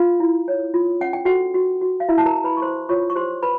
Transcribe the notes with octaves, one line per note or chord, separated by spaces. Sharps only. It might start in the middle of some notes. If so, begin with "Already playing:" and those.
Already playing: F4 F5
E4
C#5
F4
C#4 F#5
G5
F#4 A4 F#5
F#4
F#4
F5
E4 E5
A5
A#4 A#5
A#4 A#5
B4 B5
C#6
A#4 C5 C6
F4 C#5 C#6
C#6
G4 C5 C6
B4 C5 B5